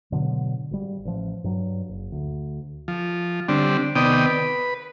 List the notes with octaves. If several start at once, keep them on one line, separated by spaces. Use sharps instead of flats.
G#2 B2 D3 F#3
G#1 G3
A1 F3
G2 F#3
F#1
D2
F3
D3 G3 C4 D4
C3 D#3 B3 D5 G5 D#6
B4